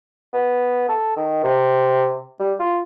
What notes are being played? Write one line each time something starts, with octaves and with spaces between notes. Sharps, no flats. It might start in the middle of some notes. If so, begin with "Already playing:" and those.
B3
A4
D#3
C3
G3
F4